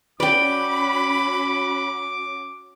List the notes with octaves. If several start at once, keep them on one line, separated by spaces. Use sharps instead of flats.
C#4 F#4 D5 G5 B5 D6